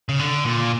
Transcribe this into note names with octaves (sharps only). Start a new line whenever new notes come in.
C#3
D3
A#2